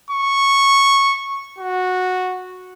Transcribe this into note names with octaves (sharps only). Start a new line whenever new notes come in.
C#6
F#4